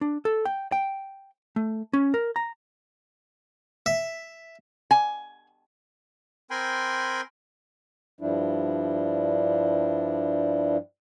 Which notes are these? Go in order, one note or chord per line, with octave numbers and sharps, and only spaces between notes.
D4
A4
G5
G5
A3
C#4
A#4
A#5
E5
G#5
C4 A#4 G5 G#5 B5 C6
G2 F3 G3 D4 E4